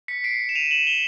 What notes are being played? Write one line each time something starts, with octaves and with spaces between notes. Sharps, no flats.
B6 C#7
C7 D7
E7
D#7 F7
E7 F#7
F7 G7